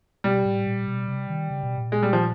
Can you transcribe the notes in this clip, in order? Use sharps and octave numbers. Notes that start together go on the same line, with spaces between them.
B2 G3
A2
A#2
B2
C3
D#3
C#3
B2
A#2
G#3
G3
F3